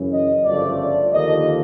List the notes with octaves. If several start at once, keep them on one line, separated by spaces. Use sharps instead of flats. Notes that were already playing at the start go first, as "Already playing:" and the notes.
Already playing: F#2 C#3 E3
D#5
G1 F#2 C#3 F3 A3 D5
D5
D#2 D3 F3 A#3 D#5